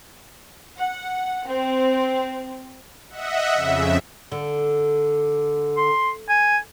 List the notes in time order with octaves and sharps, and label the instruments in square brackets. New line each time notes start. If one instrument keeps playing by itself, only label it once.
[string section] F#5
C4
[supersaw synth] D#5 E5 F#5
F2 C#3 E5
[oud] D3
[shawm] C6
G#5